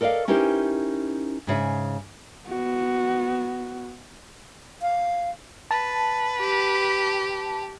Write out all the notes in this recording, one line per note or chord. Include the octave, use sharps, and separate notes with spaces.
A4 A#4 D5 D#5 F5
C#4 D#4 E4 G4 A#4 C5
G#2 C#3 E5 G#5
B3 F#4
F5
B4 A5
G4